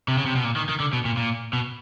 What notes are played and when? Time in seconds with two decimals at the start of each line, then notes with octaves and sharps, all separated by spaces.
0.08 C3
0.18 C#3
0.26 C3
0.36 B2
0.44 A#2
0.56 D#3
0.69 D#3
0.80 D3
0.93 B2
1.05 A#2
1.17 A#2
1.53 B2